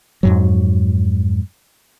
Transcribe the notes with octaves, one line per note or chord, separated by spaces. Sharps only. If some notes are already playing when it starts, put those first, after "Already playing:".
F2 G#2 F#3